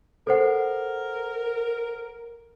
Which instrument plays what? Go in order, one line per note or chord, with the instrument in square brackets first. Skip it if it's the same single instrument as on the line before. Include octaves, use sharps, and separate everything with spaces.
[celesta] A4 C5 F#5 [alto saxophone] A#4